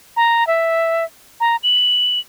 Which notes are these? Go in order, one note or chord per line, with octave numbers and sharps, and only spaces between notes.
A#5
E5
A#5
F#7